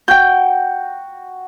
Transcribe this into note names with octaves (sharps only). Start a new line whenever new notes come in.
F#4 G5 G6